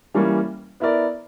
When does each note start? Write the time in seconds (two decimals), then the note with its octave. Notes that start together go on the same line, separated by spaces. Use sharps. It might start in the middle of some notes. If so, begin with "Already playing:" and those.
0.14 E3 G3 A#3 C#4
0.80 B3 E4 A#4 D5